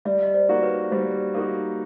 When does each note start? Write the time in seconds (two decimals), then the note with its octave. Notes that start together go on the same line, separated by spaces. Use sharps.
0.05 G3 D5 E5
0.23 D#5
0.34 C5 D5
0.49 A#3 D#4 F#4
0.63 B4 C#5
0.92 G3 C5
1.34 A#3 D#4 F#4 A4